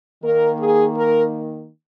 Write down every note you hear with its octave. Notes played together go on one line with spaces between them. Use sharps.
D#3 A#3 A#4
G#4
A#4